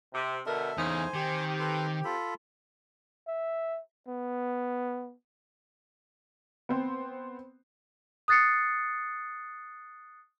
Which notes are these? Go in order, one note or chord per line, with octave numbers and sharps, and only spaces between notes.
C3
B2 D3 A4 A#4 E5
E2 A2 C#3 D#4 C5 G#5
D#3 C4 G4
A4 B4 C6
F4 A4 B5
E5
B3
B3 C4 C5
D#6 F#6 A6 C7 C#7